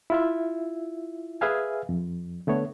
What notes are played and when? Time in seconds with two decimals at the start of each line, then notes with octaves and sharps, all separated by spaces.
0.10 E4 F4 E5
1.41 G#4 B4 E5 F5 G#5
1.89 F2
2.47 D3 A3 B3 C#5